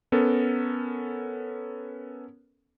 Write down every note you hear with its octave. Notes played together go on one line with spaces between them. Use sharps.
B3 C#4 A4 A#4